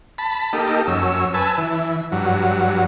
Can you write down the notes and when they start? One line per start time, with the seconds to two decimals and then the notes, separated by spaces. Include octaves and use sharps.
0.18 A5 B5
0.53 A#3 D#4 G4 A4
0.87 F#2 C#4 E6
1.34 B4 G#5 A5 E6
1.58 E3
2.12 G2 F#3